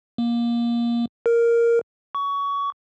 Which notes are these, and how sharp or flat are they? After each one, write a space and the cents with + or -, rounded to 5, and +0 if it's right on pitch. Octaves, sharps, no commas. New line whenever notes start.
A#3 +20
A#4 +0
C#6 +25